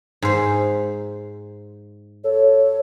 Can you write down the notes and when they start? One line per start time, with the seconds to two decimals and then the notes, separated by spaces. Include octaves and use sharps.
0.22 G#2 C5
2.24 A4 C#5